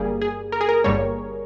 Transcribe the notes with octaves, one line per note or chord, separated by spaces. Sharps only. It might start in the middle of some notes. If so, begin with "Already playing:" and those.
Already playing: G1 G2 G3 A#3 G#4
G#4
A#4
G#4
A#4
G1 G2 G3 A#3 C#5